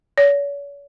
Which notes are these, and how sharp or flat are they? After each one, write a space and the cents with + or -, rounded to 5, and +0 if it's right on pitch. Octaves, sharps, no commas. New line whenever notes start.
C#5 +40